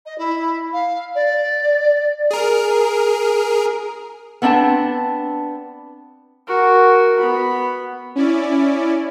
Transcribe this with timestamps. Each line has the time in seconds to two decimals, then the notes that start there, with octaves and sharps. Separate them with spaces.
0.06 D#5
0.18 E4
0.73 F5
1.15 D5
2.31 G#4 A#4
4.42 B3 C4 D4 F#5 A5
6.48 F#4 A#4
7.20 B3 B5
8.15 C#4 E4 D5